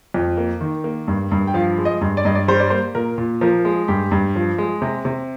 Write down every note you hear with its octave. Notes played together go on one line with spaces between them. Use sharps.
F2
A#3
D#3
A#3
G2
G2
G5
F3 F5
G#3
D#5
G2
D5
G2 D#5
D5
G3 C5
D5
A#3 C5
A#2 A#4
A#2
F3 A#4
G#3
G2 G4
G2
F3
G#3
C3
C3